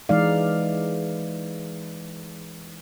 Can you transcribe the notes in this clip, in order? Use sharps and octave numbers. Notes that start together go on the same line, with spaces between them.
E3 G#3 D#4 D5 F5